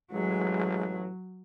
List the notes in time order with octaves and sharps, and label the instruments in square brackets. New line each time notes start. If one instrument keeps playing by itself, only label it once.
[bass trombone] A1 [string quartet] F#3 [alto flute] G#3